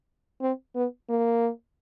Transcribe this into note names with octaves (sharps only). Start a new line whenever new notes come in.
C4
B3
A#3